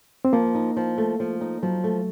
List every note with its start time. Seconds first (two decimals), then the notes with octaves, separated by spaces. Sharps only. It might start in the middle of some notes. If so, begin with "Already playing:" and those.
0.25 C4
0.33 F3 A#3
0.55 D#4
0.77 F3
0.98 A3
1.20 F3
1.41 D#4
1.63 F3 F#3
1.84 A3